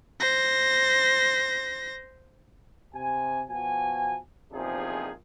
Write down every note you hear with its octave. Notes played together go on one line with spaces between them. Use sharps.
C5 A#6
C3 G#5
B2 F3 F#4 G#5
A#1 E2 C3 F3 D#4 G#4